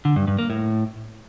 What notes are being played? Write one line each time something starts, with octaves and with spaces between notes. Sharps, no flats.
D3
G2
G2
A#3
A2